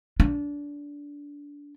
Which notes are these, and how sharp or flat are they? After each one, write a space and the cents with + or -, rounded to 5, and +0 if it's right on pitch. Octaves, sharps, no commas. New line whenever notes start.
D4 -20